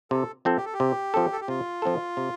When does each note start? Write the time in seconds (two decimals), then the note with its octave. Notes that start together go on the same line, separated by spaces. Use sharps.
0.11 C3 A4
0.45 F3 C4 A4
0.57 G4
0.65 A4
0.73 G4
0.80 C3
1.14 F3 C4 A4
1.33 A4
1.41 G4
1.48 C3 F4
1.82 F3 C4 A4
2.17 C3